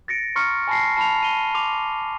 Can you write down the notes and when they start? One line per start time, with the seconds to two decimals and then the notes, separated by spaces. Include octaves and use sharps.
0.08 A6 A#6 C#7 D7
0.36 A#5 C6 C#6 F6 C#7
0.68 G#5 A5 B5 A#6 C7
0.97 A5 B5 F7
1.23 D#7 F7 G7
1.55 C6 D6 F7